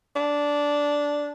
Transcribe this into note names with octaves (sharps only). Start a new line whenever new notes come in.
D4